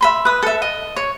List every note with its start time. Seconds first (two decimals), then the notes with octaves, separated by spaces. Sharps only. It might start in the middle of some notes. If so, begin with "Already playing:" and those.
0.01 E5 B5 C6
0.25 B4 D#6
0.43 A4 E5
0.62 D#5
0.96 C#5